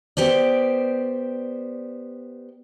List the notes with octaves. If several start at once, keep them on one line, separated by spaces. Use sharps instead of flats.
B3 G4 C5 D5